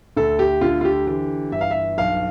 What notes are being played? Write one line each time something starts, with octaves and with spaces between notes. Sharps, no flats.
D2 A4
G4
D3 F4
F4
G4
E3 G4
G1 E5
F5
E5
B1 F5